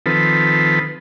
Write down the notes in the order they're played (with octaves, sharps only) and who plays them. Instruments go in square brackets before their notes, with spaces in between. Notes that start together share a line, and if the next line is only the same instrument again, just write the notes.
[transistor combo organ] D#3 F3 C4 A4 B4